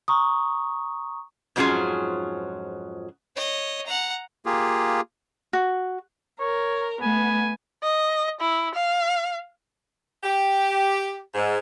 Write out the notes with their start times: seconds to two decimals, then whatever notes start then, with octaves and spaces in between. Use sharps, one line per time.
0.08 A#5 C#6 D#6
1.56 F2 G#2 F#3 C#4 F4 G#4
3.36 C#5 D#5
3.87 F#5 A#5
4.46 A#3 F4 G4 G#4
5.53 F#4
6.39 A#4 C#5
7.01 A3 B3 G#5
7.83 D#5
8.41 E4
8.75 F5
10.24 G4
11.34 G#2